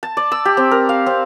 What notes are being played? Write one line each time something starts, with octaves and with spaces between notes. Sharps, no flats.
A5
D5
E6
G4
C4
A#4
F5
C4